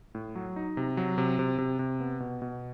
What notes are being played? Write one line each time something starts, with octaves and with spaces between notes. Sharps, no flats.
A2
F#3
D#4
C3
F#3
C3
C3
C3
C3
B3
B2
B2